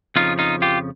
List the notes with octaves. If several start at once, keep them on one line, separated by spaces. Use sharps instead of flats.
F2 C#3 F3 D#4 F4
D#4 F4
F4 G4